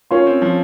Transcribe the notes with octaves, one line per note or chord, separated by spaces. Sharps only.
C#4 F4 A#4 C#5 F5 C6
C4
F3